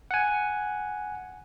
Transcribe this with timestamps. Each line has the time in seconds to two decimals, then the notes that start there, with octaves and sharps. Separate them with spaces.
0.11 F#5 G#5